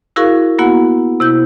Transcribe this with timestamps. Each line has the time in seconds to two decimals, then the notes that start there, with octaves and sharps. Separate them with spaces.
0.16 E4 F#4 G#4 A#4 F5 C#6
0.59 A#3 B3 E4 F#4 F#5
1.20 C3 E4 G6